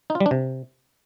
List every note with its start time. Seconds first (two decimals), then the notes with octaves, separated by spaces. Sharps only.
0.10 D#4
0.15 F4
0.20 G3
0.26 D4
0.31 C3